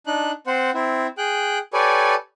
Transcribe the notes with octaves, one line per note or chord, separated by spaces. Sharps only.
D4 D#4 F#6
C4 C5 F#5
C4 E4
G#4 G5 F#6
G4 A4 B4 C#5 D5 G#5